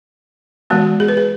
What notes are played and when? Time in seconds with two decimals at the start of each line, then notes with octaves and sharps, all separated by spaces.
0.70 E3 G#3 B3 F#4
1.00 G#4
1.08 B4
1.17 G#4